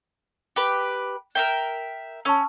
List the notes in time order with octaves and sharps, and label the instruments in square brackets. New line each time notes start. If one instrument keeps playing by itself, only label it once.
[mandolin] G4 B4
A#4 E5 G5
[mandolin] C#4 [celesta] A5 C#6 E6